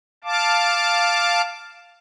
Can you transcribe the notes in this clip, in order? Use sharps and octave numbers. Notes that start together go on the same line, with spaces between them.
F5 A5 D6